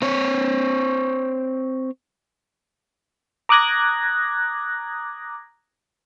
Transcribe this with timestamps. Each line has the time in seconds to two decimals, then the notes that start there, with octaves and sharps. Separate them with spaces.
0.02 C4 C#5
3.49 A#5 D6 D#6 F#6 G#6 A#6